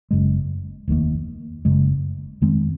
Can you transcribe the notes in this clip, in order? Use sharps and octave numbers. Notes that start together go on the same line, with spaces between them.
F#1 F#2 C#3 G#3
F1 D#2 D#3 A#3
F#1 F#2 C#3 G#3
F2 D#3 G#3 C4